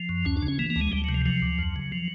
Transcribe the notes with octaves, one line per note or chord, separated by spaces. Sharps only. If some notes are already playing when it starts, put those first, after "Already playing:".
Already playing: F3
F#2
D2 C#4
D4
C#3
C#4
E3 A#3
A#3
D2
G#3
D2 G3
C3 F#3
F3
F3 F#3
D2
F2
C#3
F3